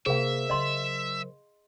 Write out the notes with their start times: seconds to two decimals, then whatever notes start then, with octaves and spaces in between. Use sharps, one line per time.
0.06 C3 A#3 G#4 A#4 C5 E5 F5
0.50 C#3 F#3 D#5 C6